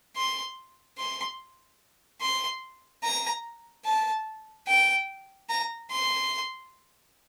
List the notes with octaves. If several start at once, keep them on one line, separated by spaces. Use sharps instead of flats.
C6
C6
C6
A#5
A5
G5
A#5
C6